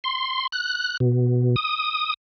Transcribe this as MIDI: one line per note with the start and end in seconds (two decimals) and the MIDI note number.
0.04 0.47 84
0.52 0.97 90
1.00 1.56 47
1.56 2.14 87